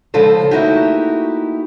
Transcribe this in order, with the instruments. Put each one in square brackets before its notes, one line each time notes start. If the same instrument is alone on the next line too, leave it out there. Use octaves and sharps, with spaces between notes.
[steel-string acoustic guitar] C#3 F3 G#3 F4 A4 C5
A3 A#3 D#4 E4 F#4 G4